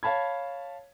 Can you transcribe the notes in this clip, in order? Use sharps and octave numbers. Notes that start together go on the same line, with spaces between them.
C#5 F5 A5 B5 G#6